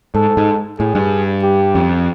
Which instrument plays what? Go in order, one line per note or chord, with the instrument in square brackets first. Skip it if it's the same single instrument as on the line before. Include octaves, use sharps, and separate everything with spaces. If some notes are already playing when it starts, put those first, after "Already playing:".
[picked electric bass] G#2 [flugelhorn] A4
[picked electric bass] G#2
[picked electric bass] A2 [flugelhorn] G#4
[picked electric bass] G2
[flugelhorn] G4
[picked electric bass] F2